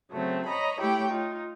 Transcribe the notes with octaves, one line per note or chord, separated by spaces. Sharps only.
C#3 F#3 A3 C4
C#5 D#5 A#5 B5
A3 E4 G4 C#5 G5
D#4 F4